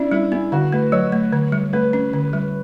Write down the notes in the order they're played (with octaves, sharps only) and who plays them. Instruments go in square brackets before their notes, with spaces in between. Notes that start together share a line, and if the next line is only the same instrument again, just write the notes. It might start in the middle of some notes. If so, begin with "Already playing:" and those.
Already playing: [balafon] C#4 [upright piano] D4 E4
[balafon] G3 [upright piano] E4
[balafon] B3 [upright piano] E4
[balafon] D3 [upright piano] F#4
[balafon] A3 [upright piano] B4
[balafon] F#3 [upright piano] C#5
[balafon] A3
D3
G3
[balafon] A3 [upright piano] B4
[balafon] C#4
D3
G3